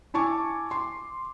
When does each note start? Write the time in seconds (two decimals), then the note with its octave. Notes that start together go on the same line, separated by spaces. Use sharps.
0.14 E4 G#5 A5 C#6 D6
0.71 C6